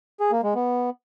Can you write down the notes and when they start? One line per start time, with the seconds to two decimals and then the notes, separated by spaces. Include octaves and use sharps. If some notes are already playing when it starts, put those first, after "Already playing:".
0.20 G#4
0.32 A#3
0.44 G#3
0.55 B3